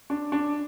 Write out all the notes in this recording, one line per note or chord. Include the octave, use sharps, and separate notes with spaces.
D4
D4